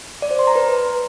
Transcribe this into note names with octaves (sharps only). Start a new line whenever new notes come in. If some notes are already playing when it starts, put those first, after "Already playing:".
D5
C5
C6
A#5
B4